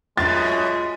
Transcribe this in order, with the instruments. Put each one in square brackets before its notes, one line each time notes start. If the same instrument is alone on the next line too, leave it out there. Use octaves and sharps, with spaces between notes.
[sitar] F#2 B2 [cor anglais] G#3 [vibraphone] F4 E5 [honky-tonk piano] A6